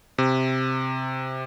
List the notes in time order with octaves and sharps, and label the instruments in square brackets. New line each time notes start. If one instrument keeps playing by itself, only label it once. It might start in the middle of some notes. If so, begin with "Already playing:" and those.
[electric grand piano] C3